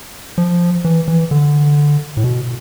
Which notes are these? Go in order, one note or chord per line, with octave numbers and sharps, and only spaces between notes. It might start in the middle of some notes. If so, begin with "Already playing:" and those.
F3
E3
E3
D3
A2
B2